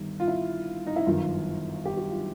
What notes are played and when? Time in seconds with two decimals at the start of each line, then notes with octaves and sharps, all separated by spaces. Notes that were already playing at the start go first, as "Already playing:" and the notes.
Already playing: G1 D#3 G3
0.20 F4
0.28 E4
0.87 D#4
0.96 E4
1.06 G1 F#2 D#3 F4
1.85 G4
1.97 F#4
2.11 F4